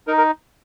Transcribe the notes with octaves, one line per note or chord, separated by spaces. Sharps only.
D#4 A#4
A#4